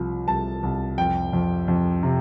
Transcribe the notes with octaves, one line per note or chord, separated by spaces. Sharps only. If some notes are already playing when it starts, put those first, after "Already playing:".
Already playing: C2 F3
C2 A5
C2
F2 G5
F2
F2
C3